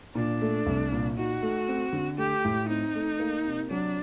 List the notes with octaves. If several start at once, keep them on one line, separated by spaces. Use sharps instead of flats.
A#2 D4
A3
C2
A#2
D#4 F#4
A3
C4
D3
A3 G4
A2
C4 D#4
A3
A#3
C3
F#3 D4